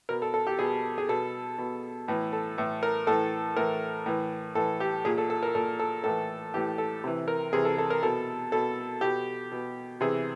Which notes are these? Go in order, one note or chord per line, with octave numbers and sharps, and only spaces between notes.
B2 A#4
A4
A4
G4
B2 G#4
G#4
B2 A4
B2
A2 E3
A4
A2 E3
A#4
A2 E3 A4
A2 E3 A#4
A2 E3
A2 E3 A4
G4
A#2 G#4
A4
A4
A#4
A#2 A4
A4
A2 E3 A4
A2 E3 G4
A4
C3 E3
A#4
C3 E3 G#4
A4
A4
A#4
B2 A4
B2 A4
B2 G4
B2
C3 E3 G#4